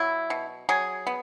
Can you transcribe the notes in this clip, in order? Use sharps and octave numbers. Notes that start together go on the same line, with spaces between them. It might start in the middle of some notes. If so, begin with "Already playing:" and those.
Already playing: F#3 E4
B2
F#3 G#4
B3